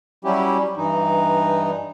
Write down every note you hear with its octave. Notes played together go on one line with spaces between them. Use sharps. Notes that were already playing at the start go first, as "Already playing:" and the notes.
F#3 G3 C#4 E4 G4
G2 E3 D#4